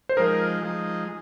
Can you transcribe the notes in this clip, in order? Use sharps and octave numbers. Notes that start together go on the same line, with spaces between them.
C5
F3 G#3 D#4 A#4
F3 G#3 D#4